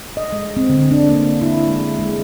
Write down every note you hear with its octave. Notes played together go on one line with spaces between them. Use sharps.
D#5
G#3
C4
D3
D4
A#3
E4
G#3
G#3